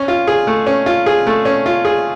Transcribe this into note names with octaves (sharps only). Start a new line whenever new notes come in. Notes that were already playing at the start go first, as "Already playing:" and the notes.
Already playing: C#4
F4
G#4
A3
C#4
F4
G#4
A3
C#4
F4
G#4